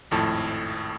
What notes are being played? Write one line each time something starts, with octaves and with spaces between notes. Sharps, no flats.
G#1 F2 A2 A5